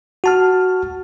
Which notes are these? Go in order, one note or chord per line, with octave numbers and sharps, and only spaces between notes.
F#4 A5 F6